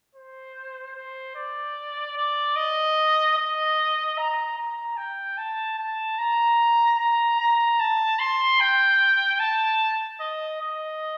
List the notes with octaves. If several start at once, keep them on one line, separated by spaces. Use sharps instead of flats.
C5
C5
D5
D5
D#5
D#5
A#5
A#5
G5
A5
A5
A#5
A#5
A#5
A5
C6
G5
A5
D#5
D#5